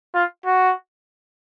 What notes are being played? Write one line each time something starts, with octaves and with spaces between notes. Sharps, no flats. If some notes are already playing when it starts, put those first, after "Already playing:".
F4
F#4